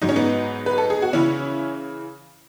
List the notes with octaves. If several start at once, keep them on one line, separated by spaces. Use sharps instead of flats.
G#2 F#3 D#4
C#4
B3 D#4
B4
A4
G#4
F#4
C#3 E3 C#4 E4